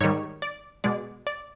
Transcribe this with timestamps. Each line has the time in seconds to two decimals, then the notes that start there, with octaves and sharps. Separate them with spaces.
0.01 G#2 D#3 G3 C#5
0.42 D5
0.84 B2 G#3 D5
1.27 D5